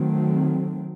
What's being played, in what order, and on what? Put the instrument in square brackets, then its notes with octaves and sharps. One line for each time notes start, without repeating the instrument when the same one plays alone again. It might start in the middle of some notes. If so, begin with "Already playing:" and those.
Already playing: [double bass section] D#3 F#3 A3 C4